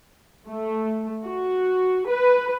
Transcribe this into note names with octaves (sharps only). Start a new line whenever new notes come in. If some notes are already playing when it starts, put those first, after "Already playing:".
A3
F#4
B4